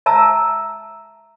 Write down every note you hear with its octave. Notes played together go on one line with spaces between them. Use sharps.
E5 A5 A#5 E6